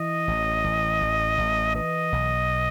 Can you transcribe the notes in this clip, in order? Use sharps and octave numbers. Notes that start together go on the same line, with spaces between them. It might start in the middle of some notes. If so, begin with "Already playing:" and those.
Already playing: E3 D#5
A1
A1
A1
A1
E3 D#5
B1